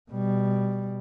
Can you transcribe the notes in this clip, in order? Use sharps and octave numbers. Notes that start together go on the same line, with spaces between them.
B2 G3